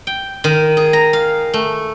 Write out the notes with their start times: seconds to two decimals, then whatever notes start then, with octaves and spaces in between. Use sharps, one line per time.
0.07 G5
0.44 D#3
0.77 G#4
0.93 A#5
1.13 F5
1.54 A3